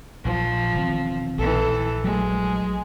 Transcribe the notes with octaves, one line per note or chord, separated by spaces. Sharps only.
A#1 F3
E1 D#3 C4
A#1 E3 A4
F#3 G#3 A3